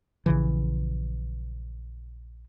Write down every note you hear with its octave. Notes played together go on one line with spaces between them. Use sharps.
A#1 C#3 E3